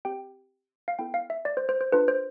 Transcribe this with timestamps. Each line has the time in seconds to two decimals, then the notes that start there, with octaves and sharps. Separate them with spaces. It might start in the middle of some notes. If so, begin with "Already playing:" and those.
0.05 C4 G4 G5
0.88 F5
0.99 B3 E4 A4 G5
1.14 F5
1.30 E5
1.45 D5
1.57 C5
1.69 C5
1.81 C5
1.92 D4 F4 A4 B4
2.08 C5